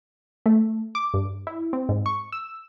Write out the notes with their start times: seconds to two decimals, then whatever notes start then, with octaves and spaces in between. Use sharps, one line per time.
0.46 A3
0.95 D6
1.14 G2
1.47 E4
1.73 C4
1.89 G#2
2.06 C#6
2.32 E6